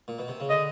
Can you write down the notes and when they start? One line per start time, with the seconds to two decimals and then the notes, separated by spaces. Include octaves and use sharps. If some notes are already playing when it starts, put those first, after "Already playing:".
0.08 A#2
0.19 B2
0.28 C3
0.40 C#3
0.50 D3 D#5